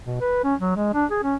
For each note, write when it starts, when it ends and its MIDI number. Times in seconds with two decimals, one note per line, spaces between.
0.06 0.17 47
0.21 0.40 71
0.44 0.55 61
0.59 0.76 54
0.76 0.90 56
0.94 1.05 62
1.10 1.21 68
1.22 1.35 61